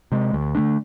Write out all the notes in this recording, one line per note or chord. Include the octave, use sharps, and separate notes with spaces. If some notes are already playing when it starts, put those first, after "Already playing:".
C3 G#3
D2
D3 A3 D4